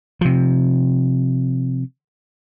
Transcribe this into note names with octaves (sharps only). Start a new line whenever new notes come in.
C3 F3